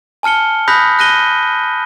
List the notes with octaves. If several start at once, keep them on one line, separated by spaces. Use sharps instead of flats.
G#5 A5 F6 C#7 G7
B5 D#6 F#6 G6 A#6 B6
F#6 A#6 D#7 G7